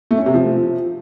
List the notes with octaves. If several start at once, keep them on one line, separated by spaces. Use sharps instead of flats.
A3
C#4
C3
F3